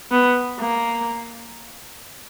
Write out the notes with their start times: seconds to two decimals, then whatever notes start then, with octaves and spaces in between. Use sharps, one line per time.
0.11 B3
0.60 A#3